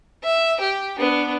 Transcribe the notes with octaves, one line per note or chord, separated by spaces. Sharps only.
E5
G4
B3 D4